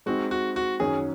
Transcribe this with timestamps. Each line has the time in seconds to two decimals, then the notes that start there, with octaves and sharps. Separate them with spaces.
0.06 G#3 C4 D#4 F#4
0.31 F#4
0.56 F#4
0.80 F#2 D#3 F#3 C#4 G#4